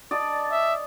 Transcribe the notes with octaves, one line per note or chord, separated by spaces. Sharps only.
D5 D#5 A5
E5